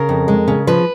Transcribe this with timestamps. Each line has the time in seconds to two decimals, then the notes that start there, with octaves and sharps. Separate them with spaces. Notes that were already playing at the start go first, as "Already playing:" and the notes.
Already playing: C#3 A#4
0.09 F2
0.28 G#3
0.48 C#3
0.67 F3 B4